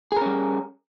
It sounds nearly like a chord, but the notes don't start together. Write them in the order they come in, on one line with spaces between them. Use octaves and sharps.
G#4 A#4 C#4 G3